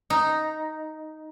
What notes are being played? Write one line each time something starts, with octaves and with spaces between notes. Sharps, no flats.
D#4